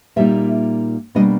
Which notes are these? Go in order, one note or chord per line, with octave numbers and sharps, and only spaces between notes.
A#2 G3 A#3 D#4 E5
B2 G3 A#3 D4 D#5